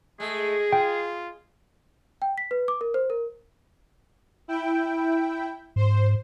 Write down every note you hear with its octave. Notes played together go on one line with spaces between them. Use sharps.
G#3 A3 G#4
F4 G5
G5
B6
B4
D6
A#4
C5
A#4
E4 G5
G#2 C5